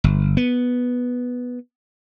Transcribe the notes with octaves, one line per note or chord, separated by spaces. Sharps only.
G1
B3